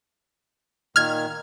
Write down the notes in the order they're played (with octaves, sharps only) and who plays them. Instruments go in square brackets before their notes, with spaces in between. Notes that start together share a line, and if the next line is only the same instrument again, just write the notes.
[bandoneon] A#2 D#3 [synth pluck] F6 G#6